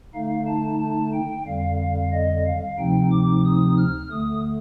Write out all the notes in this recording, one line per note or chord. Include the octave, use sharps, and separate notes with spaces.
D3 A3 D#4 F5
A5
A5
G5
F2 D3 G3 F5
F5
D#5
F5
D2 C3 F3 C4 D#4 G5
D6
D#6
F6
D2 D3 A3 D#6